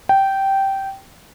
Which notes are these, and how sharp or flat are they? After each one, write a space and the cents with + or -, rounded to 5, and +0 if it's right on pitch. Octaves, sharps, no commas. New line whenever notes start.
G5 -10